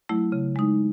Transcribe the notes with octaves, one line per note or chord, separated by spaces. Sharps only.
F#3 A3 E4
C#3
G#3 D#4